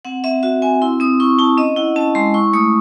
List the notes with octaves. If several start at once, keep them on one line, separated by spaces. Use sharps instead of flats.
C4 F#5
C4 E5
F#4 E5
C4 G#5
E4 C6
C4 D#6
E4 C#6
E4 A5
C#4 D#5
E4 F#5
C#4 A5
G#3 C6
E4 C#6
A3 D#6